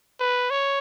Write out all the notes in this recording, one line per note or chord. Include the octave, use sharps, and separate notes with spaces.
B4
C#5